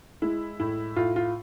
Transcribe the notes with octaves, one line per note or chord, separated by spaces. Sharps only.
G#3 E4
A2 E4
A2 F4
F4